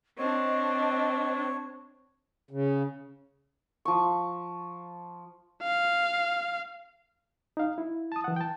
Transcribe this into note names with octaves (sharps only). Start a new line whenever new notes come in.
C4 D4 C#5 D#5
C#3
F3 C#6
F5
D#4 F5
E4
A5 D#6
E3 F#5
G5 A5